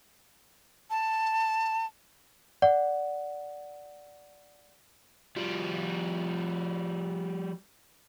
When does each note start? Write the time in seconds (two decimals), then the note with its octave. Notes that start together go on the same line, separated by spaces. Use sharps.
0.90 A5
2.62 D5 F#5
5.37 F3 G3